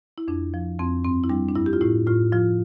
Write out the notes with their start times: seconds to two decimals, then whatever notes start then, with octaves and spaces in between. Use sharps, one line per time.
0.18 E4
0.28 F2 D4
0.54 F3
0.79 F2 C4
1.04 G2 C4
1.24 E4
1.30 G3 D4
1.49 D4
1.55 G2 E4
1.66 G4
1.73 F4
1.81 A2 E4
2.06 A2 F4
2.32 F3 F4